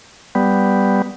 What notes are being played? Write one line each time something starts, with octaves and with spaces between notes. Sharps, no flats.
G3 B3